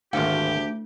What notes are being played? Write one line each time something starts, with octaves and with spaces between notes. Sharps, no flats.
G#1 D2 D4 G4 F5